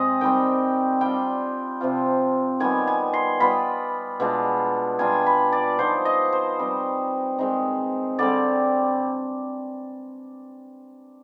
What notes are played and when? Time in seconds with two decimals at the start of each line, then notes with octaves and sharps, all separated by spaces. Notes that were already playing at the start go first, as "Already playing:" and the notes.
Already playing: C3 G#3 C4 D#5
0.21 D#3 G3 C4 G5
1.01 G3 D4 F4 G5
1.81 C3 F3 C4 F4
2.60 D#3 G3 B3 G#5
2.87 G#5
3.14 C6
3.40 G3 B3 F4 B5
4.20 B2 G#3 D4 F4
4.99 G3 D4 F4 G#5
5.26 B5
5.52 D5
5.79 F3 B3 D#4 C5
6.05 D#5
6.33 C5
6.59 G3 C4 D#4
7.39 D#3 G#3 C4 D#4
8.19 D3 G3 C4 D5